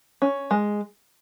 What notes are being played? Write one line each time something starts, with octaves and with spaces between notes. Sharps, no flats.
C#4
G#3